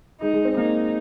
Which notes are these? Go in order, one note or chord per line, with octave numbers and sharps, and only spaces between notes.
G#3 D#4
G#3
C4
A#3 D#4